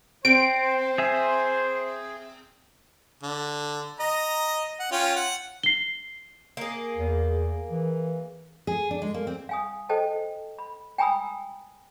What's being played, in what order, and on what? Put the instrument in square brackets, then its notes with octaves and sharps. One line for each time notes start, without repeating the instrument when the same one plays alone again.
[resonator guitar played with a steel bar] C4 [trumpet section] C5 [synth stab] D7
[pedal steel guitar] G#4 E5 G#5
[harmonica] D3
D#5 A#5
F#5
C#4 F4 G5
F#5
[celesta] C7 G7
[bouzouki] A#3 G#4
[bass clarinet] E2
E3
[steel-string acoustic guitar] G#4
D4
G#3
A#3
C4
[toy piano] F5 G#5 D#6
A4 C5 D#5 G5 A5
B5
G5 G#5 A#5 B5 D#6 E6